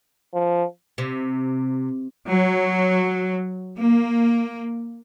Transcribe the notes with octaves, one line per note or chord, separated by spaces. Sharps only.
F3
C3
F#3
A#3